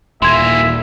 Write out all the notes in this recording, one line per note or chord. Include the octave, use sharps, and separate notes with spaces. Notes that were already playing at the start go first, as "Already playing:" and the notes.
D#1 E3 A#3 E5 C6 G#6